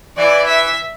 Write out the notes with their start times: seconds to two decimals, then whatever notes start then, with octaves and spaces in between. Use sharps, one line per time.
0.17 E3 D5
0.47 E5